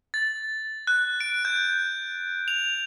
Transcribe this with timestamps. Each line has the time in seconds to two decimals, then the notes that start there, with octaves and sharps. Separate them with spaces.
0.14 A6
0.87 F#6
1.21 D7
1.45 G6
2.48 F7